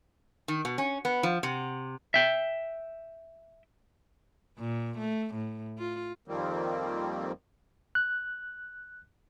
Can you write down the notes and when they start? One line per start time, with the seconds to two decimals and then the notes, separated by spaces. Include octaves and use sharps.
0.48 D#3
0.65 B2
0.78 C#4
1.05 B3
1.23 F3
1.43 C3
2.14 E5 G5
4.58 A#2
4.99 A3
5.35 A2
5.78 F4
6.27 F2 D#3 F3 G3 A#3 C4
7.95 F#6